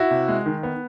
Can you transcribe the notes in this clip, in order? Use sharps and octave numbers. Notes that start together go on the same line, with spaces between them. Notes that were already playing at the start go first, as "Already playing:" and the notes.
Already playing: E4 F#4
C3
G#3
D#3
B3